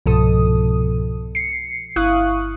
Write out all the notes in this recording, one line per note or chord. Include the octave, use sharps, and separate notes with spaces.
C2 G#2 B2 F3 A4 D#6
C7 C#7
G1 E4 F5 C#6 D#6 F#6